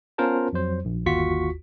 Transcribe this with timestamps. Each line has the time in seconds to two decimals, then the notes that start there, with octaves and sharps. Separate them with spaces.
0.18 B3 C#4 F4 A#4 C5 A5
0.53 F2 F#3 C5
0.85 A#1
1.06 G1 D#2 F4 F#4 C#6 B6